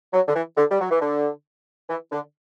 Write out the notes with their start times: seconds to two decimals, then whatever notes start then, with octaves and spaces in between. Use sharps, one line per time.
0.13 F#3
0.28 D3
0.35 E3
0.57 D3
0.71 G3
0.81 F#3
0.91 E3
1.01 D3
1.89 E3
2.12 D3